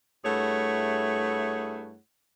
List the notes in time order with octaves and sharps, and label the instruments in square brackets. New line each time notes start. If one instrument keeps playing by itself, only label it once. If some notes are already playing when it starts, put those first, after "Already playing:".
[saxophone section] G2 A3 E4 G#4 C#5 F#5